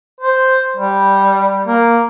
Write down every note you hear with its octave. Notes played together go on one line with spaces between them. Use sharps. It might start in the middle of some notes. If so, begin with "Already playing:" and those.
C5
G3
A#3